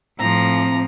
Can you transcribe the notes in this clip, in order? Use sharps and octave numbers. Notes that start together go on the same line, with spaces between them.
A2 F3 C4 A#5